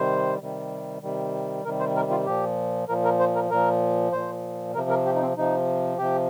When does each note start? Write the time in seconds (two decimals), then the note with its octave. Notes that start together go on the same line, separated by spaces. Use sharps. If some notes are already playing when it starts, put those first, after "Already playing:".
Already playing: C3 D#3 G3 C5
0.40 C3 D#3 G3
1.02 C3 D#3 G3
1.65 C3 D#3 G3 A#4
1.80 C5
1.96 A#4
2.11 F4
2.26 A#2 F3 G4
2.89 A#2 F3 A#4
3.05 A#4
3.20 C5
3.35 A#4
3.51 A#2 F3 A#4
4.12 A#2 F3 C5
4.74 C3 F3 A#4
4.90 A#4
5.06 G4
5.15 D#4
5.22 C4
5.37 C3 F3 D#4
5.98 C3 F3 G4